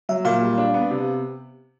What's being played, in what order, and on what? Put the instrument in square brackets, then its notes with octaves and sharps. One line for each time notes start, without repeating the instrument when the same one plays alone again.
[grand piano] F#3 [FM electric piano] E5
[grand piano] A#2 [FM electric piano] F5
[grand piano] G3
D4
B3
C3